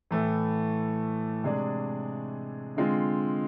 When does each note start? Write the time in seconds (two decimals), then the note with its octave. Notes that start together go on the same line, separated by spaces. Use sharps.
0.11 A2 E3 A3
1.44 C3 G#3 D4 G#4 D5
2.76 D3 G#3 C4 F4